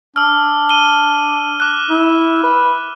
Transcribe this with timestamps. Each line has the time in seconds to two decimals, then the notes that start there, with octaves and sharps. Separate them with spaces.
0.16 D4 E6 F6
0.69 D#7 G7
1.60 D6 F#6
1.89 E4
2.43 B4